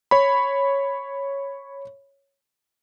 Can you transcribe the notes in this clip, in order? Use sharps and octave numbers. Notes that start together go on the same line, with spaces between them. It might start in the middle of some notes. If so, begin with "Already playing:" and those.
C#5 B5